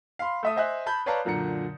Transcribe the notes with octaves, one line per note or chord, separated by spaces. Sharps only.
F5 B5 C6
A3 E5 D#6
C5 D#5 E5 G#5 F#6
A5 B5 G6
B4 C#5 D5 F5 A5 A#5
F#2 A#2 D3 A#5 C#7